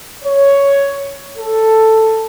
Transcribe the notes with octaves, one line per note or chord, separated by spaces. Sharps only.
C#5
A4